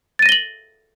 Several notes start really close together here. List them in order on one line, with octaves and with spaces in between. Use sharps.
A6 D#7 A#6 G7 F#7